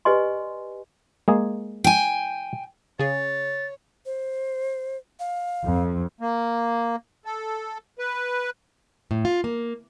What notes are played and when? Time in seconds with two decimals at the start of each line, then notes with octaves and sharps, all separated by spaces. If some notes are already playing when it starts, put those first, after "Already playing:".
0.05 G4 B4 D5 D#5 G#5 C6
1.28 G#3 A#3 G#4
1.84 G5 G#5
2.99 C#3 G#4 C#5 A6
4.06 C5
5.20 F5
5.65 F2
6.21 A#3
7.25 A4
7.99 B4
9.11 A2
9.25 F4
9.44 A#3